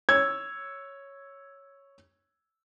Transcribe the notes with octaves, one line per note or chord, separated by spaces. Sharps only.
C#5 E6 G#6